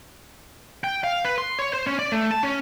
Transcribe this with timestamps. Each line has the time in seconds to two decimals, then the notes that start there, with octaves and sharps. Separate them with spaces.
0.84 G5
1.04 F5
1.25 B4
1.38 C6
1.59 C#5
1.73 C5
1.87 C#4
1.99 D5
2.12 A3
2.31 A5
2.43 C#4